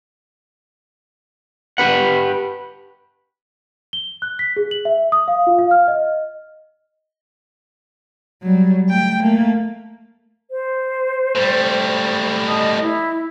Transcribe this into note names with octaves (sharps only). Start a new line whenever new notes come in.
G4 B4 F#5
G7
F#6
B6
G#4
F#7
E5
D#6
F5
F4
F5
F6
D#5
F#3 G3
A3 G5
A3 A#3
C5
A2 G3
D#5 A5 D#6
E4